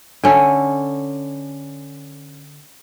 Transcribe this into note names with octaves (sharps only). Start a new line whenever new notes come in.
D3 C#4 A4